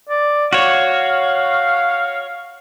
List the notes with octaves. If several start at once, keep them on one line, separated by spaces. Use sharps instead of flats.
D5
F#4 C#5 F5